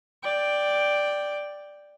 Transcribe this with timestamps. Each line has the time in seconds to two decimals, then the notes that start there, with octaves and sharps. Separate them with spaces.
0.24 D5 G5